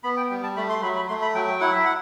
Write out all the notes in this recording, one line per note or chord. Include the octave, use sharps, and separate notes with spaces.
B3 B5
G5
G3 G5
A5
A3 B5
C6
F#3 B5
B5
A3 C6
B5
F#3 G5
G5
E4 F#5
E5
F#5